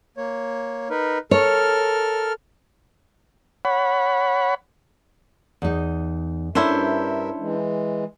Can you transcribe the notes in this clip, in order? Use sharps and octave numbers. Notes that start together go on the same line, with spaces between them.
A#3 C#5
D#4 A#4 B4
A4 A#4 C#5 F6
C#5 F#5 B5
E2 D#4
G2 C#4 D4 E4 A4 A#4 C5 E5
E3 G#3